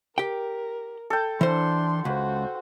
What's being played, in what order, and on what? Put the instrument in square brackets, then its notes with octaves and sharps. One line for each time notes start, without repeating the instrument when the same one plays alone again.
[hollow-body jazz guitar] G4 G5 [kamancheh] A#4
[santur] A4 G5
[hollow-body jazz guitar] E3 C5 [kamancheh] D4 C6
[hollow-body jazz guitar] C#2 [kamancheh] F#4 C5